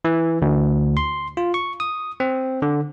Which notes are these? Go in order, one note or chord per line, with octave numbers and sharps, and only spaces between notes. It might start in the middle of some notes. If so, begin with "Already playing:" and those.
E3
D2
C6
F4
C#6
D#6
C4
D3